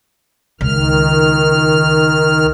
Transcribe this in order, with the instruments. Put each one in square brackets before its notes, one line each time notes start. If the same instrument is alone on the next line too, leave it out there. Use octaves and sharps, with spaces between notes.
[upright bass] C#2 [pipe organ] D#3 F6